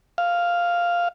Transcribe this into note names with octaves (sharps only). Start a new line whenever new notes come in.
F5